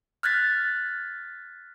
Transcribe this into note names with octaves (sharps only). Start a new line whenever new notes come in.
F6 F#6 G#6 A6 B6